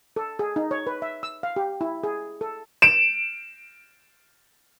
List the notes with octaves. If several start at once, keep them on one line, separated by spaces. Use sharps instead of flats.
A4
G#4
D#4
C#5
B4
E5
E6
F5
G4
E4
G#4
A4
D7 E7